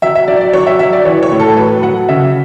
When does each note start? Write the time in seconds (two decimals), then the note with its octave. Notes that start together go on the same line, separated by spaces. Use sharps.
0.02 F#3 E5
0.15 E5
0.28 F#3 D5
0.41 D5
0.53 F#3 C#5
0.67 E5
0.79 F#3 E5
0.93 D5
1.05 E3 C#5
1.23 C#5
1.32 A2
1.40 A4
1.57 F#3 B4
1.83 F#3 F#5
2.08 C#3 E5